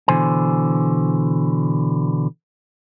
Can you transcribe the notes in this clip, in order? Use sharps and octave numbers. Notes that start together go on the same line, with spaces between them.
B2 D3 E3 C5 G#5